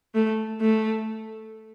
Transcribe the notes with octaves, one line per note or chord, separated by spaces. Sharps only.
A3
A3